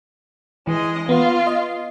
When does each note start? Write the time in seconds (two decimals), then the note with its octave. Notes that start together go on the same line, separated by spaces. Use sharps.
0.67 E3 G#3 D#5
1.09 B3 F4
1.47 D#5